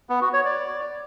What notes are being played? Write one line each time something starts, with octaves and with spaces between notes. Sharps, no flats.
B3
F#4
C#5
D5